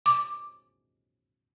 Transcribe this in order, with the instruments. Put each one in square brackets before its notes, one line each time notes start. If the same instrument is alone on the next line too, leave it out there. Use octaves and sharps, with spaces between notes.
[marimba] D6